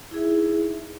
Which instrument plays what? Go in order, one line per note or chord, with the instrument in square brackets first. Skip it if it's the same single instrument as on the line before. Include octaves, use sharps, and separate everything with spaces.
[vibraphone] E4
G#4
E5
D#4